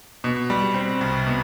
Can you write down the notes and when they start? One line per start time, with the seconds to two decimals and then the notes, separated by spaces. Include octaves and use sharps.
0.24 B2
0.50 G3
0.74 C4
1.01 C2
1.27 B2